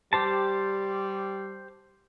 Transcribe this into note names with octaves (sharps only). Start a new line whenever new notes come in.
G3 G4 C5 A5